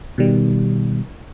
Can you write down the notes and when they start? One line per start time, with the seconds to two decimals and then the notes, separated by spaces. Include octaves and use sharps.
0.18 B2 D#3 G3